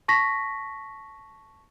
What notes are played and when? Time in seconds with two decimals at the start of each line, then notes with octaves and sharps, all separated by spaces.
0.08 A5 C#6 A#6 B6